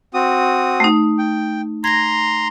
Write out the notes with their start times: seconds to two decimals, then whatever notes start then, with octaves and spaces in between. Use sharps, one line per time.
0.14 C4 F#4 D#6
0.80 A3 D#4
1.18 G5
1.84 A#5 C6 G#6 A#6